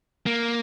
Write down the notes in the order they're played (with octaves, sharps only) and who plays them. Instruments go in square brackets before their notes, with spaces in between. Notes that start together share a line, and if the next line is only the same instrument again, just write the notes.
[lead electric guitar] A#3